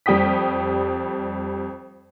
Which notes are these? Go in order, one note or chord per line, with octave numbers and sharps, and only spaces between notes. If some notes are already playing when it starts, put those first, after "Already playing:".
F2 G3 G5 D#6 B6